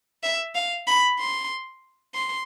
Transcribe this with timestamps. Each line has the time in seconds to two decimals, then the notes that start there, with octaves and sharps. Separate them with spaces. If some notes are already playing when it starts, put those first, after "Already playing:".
0.23 E5
0.55 F5
0.87 B5
1.19 C6
2.15 C6